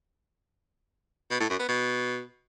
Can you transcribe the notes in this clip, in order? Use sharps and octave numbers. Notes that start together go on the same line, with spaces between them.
B2
A2
F#2
B3
B2